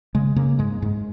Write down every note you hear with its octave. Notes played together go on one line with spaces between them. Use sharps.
C#3 G#3
C#3 A#3
G#2 G#3
G#2